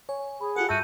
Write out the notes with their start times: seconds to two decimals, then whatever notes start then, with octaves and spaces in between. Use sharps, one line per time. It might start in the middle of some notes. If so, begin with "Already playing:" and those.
0.09 C#5 G#5
0.41 G#4 B5
0.56 F4 G4 A4 F#5
0.69 G2 F#4 E5 A5 E6 G6 D#7